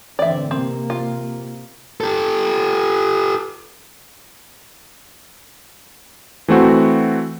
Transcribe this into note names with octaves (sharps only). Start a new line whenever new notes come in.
D3 E3 C4 D5 E5
C3 A#3 C4
F4
G4 A4
E3 A3 C4 F#4